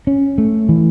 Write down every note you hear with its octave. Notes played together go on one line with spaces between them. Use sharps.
C#4
A3
E3